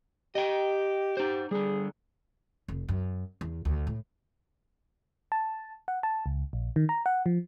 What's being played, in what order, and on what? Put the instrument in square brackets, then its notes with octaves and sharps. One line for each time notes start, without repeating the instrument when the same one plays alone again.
[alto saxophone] G4 [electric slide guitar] D#5 G5
[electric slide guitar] D#4 C5 [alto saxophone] G4
[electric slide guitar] D3 G3 [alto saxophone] G#4
[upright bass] F1
F#2
E2
D2
A2
[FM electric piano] A5
F#5
A5
C#2
A#1
D#3
A#5
F#5
F3